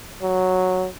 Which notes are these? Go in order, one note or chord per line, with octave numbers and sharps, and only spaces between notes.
F#3